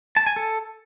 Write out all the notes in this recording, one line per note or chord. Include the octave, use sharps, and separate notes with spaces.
A5
G#5
A4